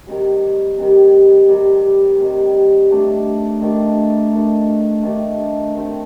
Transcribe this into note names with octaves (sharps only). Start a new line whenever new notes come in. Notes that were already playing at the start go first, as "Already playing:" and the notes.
C3 D#3 G3
C3 D#3 G3
C3 D#3 G3
C3 D#3 G3
D#3 A3 D4
D#3 A3 D4
D#3 A3 D4
D#3 A3 D4
D#3 A3 C4